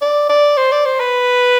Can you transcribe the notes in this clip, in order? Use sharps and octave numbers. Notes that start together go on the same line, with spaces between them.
D5
D5
C5
D5
C5
B4